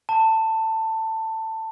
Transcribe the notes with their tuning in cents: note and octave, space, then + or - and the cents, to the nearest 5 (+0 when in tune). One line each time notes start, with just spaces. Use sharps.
A5 +15